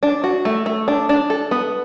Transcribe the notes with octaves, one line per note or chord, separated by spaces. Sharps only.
D4
F#4
A3
A3
D4
D4
A4
B3